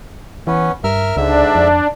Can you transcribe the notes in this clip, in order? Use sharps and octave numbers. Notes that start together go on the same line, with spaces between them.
E3 B3 C#4
G2 A#4 E5 F6
C#2 G#2 D3 D4 E5
F2